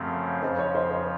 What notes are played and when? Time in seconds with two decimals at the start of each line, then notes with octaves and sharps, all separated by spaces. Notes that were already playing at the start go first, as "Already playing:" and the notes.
Already playing: F#2 C#3 F3 A3 C4
0.43 F2 C#3 F3 C5
0.59 C#5
0.75 C5
0.91 C5